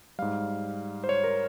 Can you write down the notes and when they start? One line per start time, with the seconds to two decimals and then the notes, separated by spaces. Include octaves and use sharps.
0.18 G#2 G3 F5
1.04 C5
1.09 C#5
1.24 A#4